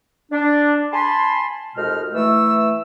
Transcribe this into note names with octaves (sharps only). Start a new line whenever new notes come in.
D4
G#5 A5 B5 C6
C2 F2 B2 G#3 D#4 F6
E3 A3 E6